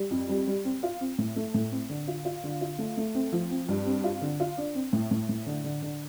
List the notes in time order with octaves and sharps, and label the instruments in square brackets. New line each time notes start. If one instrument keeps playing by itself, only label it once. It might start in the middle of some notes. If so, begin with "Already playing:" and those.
Already playing: [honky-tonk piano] G3
F2
G3
G3
C4
F4
C4
A2
A3
A2
C4
D3
F4
F4
D3
F4
A3
A3
C4
F3
C4
G2
C4
F4
D3
F4
D4
C4
A2
A2
A2
D3
D3
D3